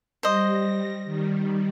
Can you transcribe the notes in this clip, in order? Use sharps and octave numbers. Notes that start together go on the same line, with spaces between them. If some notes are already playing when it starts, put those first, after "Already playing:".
G3 C5 D#5 A#6
D#3 G3